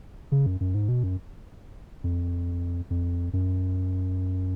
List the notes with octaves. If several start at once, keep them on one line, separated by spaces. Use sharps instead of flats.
C#3
F#2
F#2
G#2
B2
F#2
F2
F2
F#2